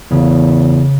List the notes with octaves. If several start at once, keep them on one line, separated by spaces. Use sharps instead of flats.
E2 C#3